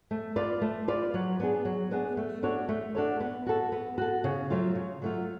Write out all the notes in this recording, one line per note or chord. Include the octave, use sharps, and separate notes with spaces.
A3
F4 B4 D5
A3
F4 B4 D5
F#3
B3 D4 G#4
F#3
B3 D4 G#4
A3
D4 F#4 A4 C#5
A3
D4 F#4 A4 C#5
B3
F#4 A4
B3
F#4 A4
C#3
F#3 A3 F4
C#3
F#3 A3 F4